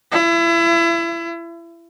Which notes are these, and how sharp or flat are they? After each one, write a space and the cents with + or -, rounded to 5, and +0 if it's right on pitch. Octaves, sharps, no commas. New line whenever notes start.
E4 +30